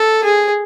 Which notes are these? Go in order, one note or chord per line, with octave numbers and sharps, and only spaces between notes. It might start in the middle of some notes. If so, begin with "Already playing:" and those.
Already playing: A4
G#4